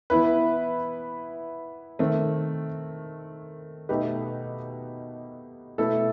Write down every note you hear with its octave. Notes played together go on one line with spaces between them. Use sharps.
E3 B3 E4 B4
D#3 A3 C4
B2 A3 D#4 G4 B4
B2 A3 E4 A4